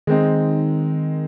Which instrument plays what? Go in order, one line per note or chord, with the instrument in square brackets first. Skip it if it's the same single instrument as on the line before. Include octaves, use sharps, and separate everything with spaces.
[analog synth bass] D#3 [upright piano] G#3 C4 D#4